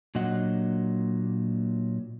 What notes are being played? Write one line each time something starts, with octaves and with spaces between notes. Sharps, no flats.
A#2 F#3 D4 D#5 F#5